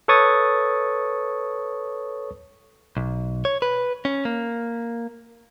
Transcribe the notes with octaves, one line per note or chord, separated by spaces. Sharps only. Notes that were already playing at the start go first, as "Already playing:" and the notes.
A4 B4 C#5 C#6 D#6 A6
B1
C#5
B4
C#4
A#3